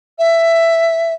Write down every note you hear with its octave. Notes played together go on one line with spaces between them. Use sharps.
E5